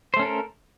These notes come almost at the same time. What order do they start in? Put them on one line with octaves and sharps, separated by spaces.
C5 A3 C#4 A4 A#4